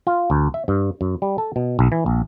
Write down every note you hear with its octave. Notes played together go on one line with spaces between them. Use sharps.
F4
D2
E5
G2
F#2
G3
A4
B2
B1
E3
A#1